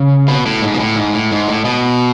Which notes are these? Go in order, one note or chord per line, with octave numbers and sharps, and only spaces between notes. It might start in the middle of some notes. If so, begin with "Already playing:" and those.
Already playing: C#3
B2
A2
G#2
B2
A2
G#2
A2
G#2
A2
B2